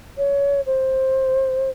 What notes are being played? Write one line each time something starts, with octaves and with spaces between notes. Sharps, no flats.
C#5
C5